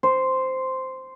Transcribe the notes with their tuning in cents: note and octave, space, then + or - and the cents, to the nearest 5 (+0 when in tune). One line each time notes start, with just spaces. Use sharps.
C5 -5